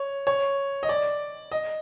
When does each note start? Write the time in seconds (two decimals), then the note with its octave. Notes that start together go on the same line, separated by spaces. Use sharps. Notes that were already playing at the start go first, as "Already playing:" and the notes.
Already playing: C#5
0.27 C#5
0.83 D#5
0.89 D5
1.52 D#5